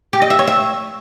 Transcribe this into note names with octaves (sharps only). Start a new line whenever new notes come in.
G4
D#5
E5
C#5
E5